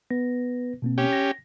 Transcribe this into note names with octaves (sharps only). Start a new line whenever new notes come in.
B3 B4 A#6
B2 A#3 C4
C#4 G4
A#6